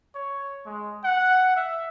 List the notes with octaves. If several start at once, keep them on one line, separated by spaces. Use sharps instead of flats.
C#5
G#3
F#5
E5